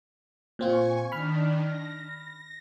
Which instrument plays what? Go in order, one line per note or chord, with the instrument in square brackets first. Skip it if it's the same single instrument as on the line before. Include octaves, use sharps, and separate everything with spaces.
[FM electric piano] A#2 C4 F4 [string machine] G#5 C#6
[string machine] D#3 D4 [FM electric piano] B5 F6
[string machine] A#6